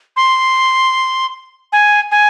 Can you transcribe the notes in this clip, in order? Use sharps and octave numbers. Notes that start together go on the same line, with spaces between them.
C6
G#5
G#5